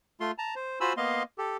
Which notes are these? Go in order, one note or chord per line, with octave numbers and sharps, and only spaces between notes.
A3 F4 C6
A5 A#5
C5
F4 F#4 C5 G#5 B5 E6
A#3 B3 D#5 F5 C6
G4 A4